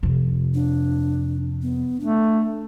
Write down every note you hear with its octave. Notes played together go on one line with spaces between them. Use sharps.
F2 C3
D4
B3
A3 D4